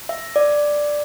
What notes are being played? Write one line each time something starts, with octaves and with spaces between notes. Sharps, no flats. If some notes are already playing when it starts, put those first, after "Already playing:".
E5
D5